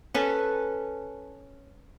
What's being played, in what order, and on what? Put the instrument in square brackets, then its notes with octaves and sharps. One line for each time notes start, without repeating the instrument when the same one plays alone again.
[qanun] C#4 A4 B4 A5